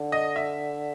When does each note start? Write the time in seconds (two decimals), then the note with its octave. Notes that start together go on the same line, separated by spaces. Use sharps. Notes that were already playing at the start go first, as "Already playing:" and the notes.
Already playing: D3
0.12 D#5
0.36 E5